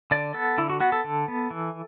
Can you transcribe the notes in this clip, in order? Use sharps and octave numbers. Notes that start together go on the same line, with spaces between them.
D3 D5
B3 A4
D3 E4
F#4
B3 F#4
A4
D3
B3
E3